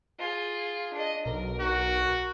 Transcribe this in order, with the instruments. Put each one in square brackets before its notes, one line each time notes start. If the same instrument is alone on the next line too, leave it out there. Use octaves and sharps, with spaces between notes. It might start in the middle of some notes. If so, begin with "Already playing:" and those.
[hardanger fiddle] F4 G#4
D4 D#5
[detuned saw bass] B1 [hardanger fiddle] A#4
[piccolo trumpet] F#4